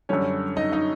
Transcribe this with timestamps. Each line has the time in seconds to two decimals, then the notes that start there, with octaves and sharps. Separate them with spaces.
0.09 F#2 D3 G3 C#4 C#5
0.57 D#4 D#5
0.72 D#4 D#5